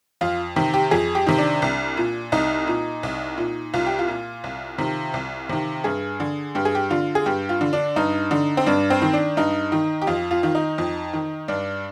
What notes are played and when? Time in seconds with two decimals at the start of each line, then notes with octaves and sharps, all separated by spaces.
0.21 F2 F4
0.56 C3 D#3 G4
0.74 G4
0.91 F2 G#4
1.15 G4
1.27 C3 D#3
1.38 D4
1.62 C2
1.97 A#2
2.32 C2 D#4
2.67 A#2
3.03 C2
3.38 A#2
3.74 C2 F4
3.86 G4
3.99 F4
4.08 A#2
4.44 C2
4.78 C3 D#3
5.14 C2
5.49 C3 D#3
5.84 G2 G#4
6.20 D3
6.55 G2 G4
6.65 G#4
6.75 G4
6.90 D3 F4
7.15 G#4
7.26 G2 G4
7.49 F4
7.61 D3
7.73 D4
7.96 G2 D#4
8.31 D3
8.57 C4
8.66 G2 D4
8.90 C4
9.02 D#3
9.13 D4
9.37 G2 D#4
9.72 D#3
10.02 G4
10.07 F2 F4
10.31 F4
10.43 D#3 F4
10.55 D#4
10.78 F2
11.13 D#3
11.48 G2 D4